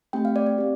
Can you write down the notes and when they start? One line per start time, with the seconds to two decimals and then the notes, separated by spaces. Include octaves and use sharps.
0.13 A3 C4 G4 G5
0.25 F5
0.36 D5
0.47 D5
0.58 C4 G4